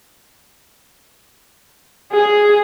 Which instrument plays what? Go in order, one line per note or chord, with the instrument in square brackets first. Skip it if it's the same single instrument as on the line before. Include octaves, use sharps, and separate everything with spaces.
[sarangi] G#4